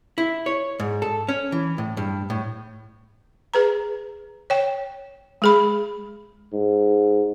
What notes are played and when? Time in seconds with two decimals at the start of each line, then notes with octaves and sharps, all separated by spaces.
0.18 E4
0.46 C#5
0.80 G#2
1.02 A4
1.28 C#4
1.52 E3
1.78 A2
1.97 G2
2.30 A2
3.54 G#4 B4 A#5
4.50 C#5 G5
5.42 G#3 G#4 B5
6.53 G#2